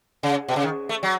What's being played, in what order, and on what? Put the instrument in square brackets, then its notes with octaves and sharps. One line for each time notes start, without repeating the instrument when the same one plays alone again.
[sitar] C#3
B2
C#3
D#3
A3
F#3